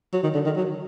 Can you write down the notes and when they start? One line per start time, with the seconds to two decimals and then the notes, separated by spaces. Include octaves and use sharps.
0.13 F#3
0.23 D#3
0.34 D3
0.45 D#3
0.56 F#3